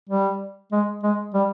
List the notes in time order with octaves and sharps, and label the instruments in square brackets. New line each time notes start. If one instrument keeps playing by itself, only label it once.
[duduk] G3
G#3
G#3
G3